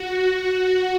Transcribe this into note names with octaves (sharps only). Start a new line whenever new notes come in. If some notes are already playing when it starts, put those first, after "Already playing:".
Already playing: F#4
F#4